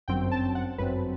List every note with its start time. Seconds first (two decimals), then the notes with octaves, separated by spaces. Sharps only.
0.08 G1 F#2 F#3 C4 G5
0.31 A5
0.55 F#5
0.78 G1 F#2 F#3 C4 B4